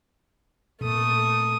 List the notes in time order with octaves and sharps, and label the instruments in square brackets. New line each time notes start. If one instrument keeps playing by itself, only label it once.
[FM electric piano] A#2 [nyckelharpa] A3 D#6